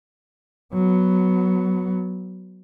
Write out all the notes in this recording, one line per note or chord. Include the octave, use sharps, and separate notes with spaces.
F#3 B3